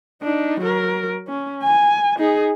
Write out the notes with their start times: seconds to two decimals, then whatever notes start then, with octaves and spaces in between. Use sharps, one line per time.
0.23 D4 D#4
0.61 F#3 A#4
1.28 C#4
1.63 G#5
2.18 D#4 G#4